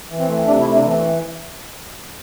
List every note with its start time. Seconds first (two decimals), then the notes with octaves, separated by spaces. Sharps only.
0.09 E3
0.19 C4
0.28 A3
0.47 C3 D4
0.61 E4
0.66 A3
0.75 D4
0.85 E3 C4